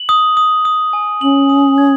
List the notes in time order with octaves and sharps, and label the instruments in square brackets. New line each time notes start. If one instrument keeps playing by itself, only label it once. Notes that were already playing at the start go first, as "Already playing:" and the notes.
Already playing: [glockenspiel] F#7
D#6
D#6
D#6
G#5
[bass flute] C#4 [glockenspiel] F#7
[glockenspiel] D#6
G#6